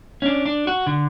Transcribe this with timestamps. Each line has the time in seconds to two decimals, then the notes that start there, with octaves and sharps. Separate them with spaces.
0.22 C#4 D4
0.46 D4
0.67 F#4
0.86 D3